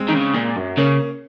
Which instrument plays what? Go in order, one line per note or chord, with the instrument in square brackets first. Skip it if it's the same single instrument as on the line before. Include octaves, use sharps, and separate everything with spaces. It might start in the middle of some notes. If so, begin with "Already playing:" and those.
Already playing: [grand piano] G#3 C4
[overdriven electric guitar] D#3
C#3
A#2
F#2
[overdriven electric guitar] C#3 [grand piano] A#3 C#4